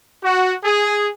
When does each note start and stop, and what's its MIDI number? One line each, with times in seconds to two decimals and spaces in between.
0.23 0.55 66
0.64 1.10 68